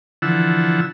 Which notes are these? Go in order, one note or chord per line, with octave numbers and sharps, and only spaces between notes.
D3 E3 F3 F#5 E6